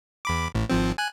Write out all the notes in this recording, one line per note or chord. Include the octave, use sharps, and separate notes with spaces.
E2 B5 D6
A1 A2
G#1 F3 C4
G#5 F#6